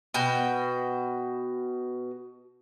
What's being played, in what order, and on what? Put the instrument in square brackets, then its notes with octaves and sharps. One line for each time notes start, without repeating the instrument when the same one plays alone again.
[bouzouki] B2 F#4 G5